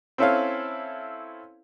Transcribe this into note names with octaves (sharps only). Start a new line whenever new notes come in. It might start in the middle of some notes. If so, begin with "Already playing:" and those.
C4 C#4 E4 A4 C#5 F5